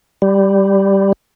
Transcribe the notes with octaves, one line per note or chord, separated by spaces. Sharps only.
G3